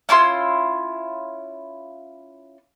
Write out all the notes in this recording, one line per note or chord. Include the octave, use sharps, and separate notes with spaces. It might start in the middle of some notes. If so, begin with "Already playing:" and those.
C#4 E4 F4 C6